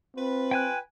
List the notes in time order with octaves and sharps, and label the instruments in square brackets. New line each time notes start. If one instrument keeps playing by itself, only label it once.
[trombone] C4 [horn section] F4 B4
[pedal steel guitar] G5 G#5 F#6